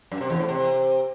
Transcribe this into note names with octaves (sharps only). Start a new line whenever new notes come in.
F#2
C3
E2
A2
C3